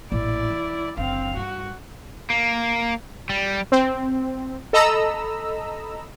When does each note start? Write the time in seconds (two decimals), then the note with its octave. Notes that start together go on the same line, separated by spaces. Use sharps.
0.12 A1 A#2 E4 D5
0.50 E3
0.97 F#1 D3 C4 F5
1.36 G2 F#4
2.30 A#3
3.30 G3
3.72 C4
4.73 A4 D#5 A#5 B5 E6